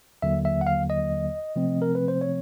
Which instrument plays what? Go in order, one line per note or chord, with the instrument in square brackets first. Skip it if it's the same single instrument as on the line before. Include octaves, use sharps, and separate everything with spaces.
[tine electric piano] D#2 D3 F#3 A#3 E5
E5
F#5
F5
D#5
C3 F3 A3 C4
A#4
B4
C5
C#5